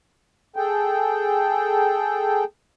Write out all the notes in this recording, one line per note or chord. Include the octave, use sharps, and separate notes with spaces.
G#4 A4 G5